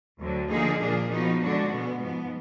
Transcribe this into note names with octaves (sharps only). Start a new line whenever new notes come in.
D2 D3 F#3
D3 F3 A#3 D#4 G#4
A#2 F3 A#3 D4 G#4
F3 B3 D#4 F#4
D3 G#3 D4 F#4
B2 G#3 B3
G#2 F3 B3